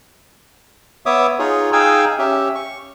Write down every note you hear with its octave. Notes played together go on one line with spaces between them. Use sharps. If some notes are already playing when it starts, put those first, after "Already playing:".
B3 C#5 E5 D6 D#6
D#4 F4 G#4 C#5
D#4 G#4 F5 G5 G#5 E6
C#4 G4 E5
C#6